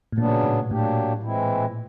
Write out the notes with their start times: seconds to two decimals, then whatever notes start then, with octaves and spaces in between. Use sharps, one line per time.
0.12 A2
0.18 A#2 C#3 F#3 B3 D4
0.44 A2
0.71 A2 F#3 A#3 D4 G4
1.23 E3 G#3 C4 E4